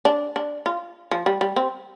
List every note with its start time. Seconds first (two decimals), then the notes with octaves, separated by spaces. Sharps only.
0.05 D4
0.36 D4
0.66 F4
1.11 F3
1.26 G3
1.41 G3
1.56 C4